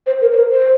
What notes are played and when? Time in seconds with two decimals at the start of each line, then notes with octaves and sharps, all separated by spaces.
0.07 C5
0.21 A#4
0.32 C5
0.36 A#4
0.51 C5